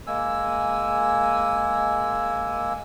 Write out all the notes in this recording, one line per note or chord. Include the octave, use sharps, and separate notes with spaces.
G#3 A#3 G#5 E6